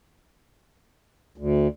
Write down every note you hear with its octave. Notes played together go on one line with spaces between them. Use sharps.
D2